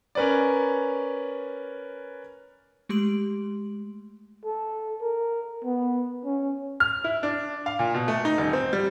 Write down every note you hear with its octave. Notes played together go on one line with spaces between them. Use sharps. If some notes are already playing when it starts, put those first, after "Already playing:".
C#4 A#4 B4 C#5 D5
G#3 A3 G4 C6 D7 F#7
A4
A#4
B3
C#4
F6
E4
D4
F5
A#2
B2
A3
D#4
D#1
C4
G3